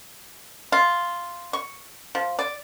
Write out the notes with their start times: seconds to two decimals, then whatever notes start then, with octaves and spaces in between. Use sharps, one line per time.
0.72 F4
1.53 C#6
2.15 F3
2.39 D5